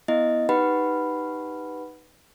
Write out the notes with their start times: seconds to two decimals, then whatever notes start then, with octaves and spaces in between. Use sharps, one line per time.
0.08 B3 E4 D#5
0.49 D#4 G4 B4 F#5 B5